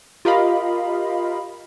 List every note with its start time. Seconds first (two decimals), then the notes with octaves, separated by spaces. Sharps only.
0.25 F4 G4 A#4 D#5 F5 B5